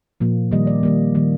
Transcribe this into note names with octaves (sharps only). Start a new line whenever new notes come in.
A#2 F3 A#3
D#3 G3 A#3 D#5
D5
D#3 G3 A#3
D#3 G3 A#3